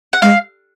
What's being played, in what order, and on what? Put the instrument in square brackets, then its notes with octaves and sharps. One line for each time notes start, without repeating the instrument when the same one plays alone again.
[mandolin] F#5
[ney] G#3 [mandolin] F5